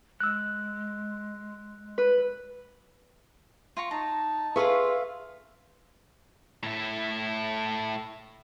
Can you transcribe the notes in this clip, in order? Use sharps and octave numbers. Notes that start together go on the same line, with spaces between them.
G#3 E6 F#6
B4
F4 A#5 C#6
D#4 A5 A#5
F4 G#4 B4 E5 F5 C6 C#6
A2 E4